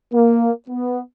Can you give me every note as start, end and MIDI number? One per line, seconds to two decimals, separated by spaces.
0.13 0.50 58
0.69 1.00 59